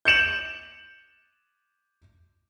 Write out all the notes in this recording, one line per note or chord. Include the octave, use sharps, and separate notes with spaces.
G6 C#7 E7 F#7